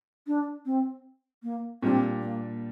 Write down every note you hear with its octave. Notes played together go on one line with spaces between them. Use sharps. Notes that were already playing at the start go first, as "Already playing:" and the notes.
D4
C4
A#3
A#2 G3 C4 D4
A#3